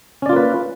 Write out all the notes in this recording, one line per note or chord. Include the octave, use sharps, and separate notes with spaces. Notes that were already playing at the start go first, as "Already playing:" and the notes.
A#3 C#4 F4 B4 D5